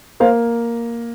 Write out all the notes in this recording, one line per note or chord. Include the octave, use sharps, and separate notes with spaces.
A#3 C5 F5